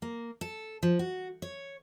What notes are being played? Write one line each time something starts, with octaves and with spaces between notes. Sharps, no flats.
A#3
A4
F3
F#4
C#5